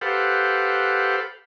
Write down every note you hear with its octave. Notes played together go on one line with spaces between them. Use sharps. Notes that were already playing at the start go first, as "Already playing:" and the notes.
G4 A4 B4 C5 F5 F#5